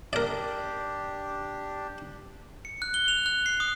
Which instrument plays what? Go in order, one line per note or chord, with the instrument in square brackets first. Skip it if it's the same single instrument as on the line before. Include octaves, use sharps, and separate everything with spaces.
[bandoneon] D4 G4 [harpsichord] A#4 D5
[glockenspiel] C#7
F#6
G7
F7
F#6
C7
D#6